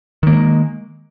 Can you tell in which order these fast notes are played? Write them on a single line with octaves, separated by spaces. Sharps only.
D#3 A#3 G#3